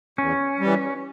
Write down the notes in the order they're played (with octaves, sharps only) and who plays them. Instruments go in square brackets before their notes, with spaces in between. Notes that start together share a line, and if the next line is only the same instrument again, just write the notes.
[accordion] E2 [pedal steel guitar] C#4
[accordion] E3 G3